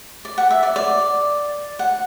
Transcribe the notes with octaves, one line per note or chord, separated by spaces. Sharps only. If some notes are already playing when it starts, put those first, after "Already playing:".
D5
F#5
E5
D5
D5
F#5